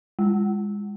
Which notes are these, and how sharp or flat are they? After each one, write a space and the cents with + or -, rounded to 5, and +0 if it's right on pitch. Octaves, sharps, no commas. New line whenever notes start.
G#3 -25